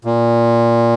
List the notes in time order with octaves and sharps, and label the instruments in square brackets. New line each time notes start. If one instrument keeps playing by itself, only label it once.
[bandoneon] A#2